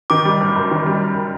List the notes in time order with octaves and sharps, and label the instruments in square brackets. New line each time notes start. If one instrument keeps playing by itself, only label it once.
[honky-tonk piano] D#3 [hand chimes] D6
[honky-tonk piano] G3
F#2
F#2
D#3
G3